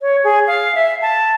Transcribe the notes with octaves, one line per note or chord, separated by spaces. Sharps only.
C#5
G#4
F5
E5
A5